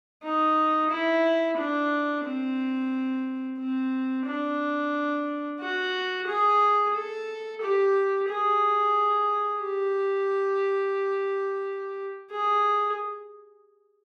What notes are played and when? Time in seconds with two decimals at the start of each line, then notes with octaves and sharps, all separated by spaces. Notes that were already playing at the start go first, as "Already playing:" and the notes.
0.23 D#4
0.90 E4
1.57 D4
2.24 C4
3.58 C4
4.26 D4
5.60 F#4
6.27 G#4
6.94 A4
7.61 G4
8.28 G#4
9.62 G4
12.31 G#4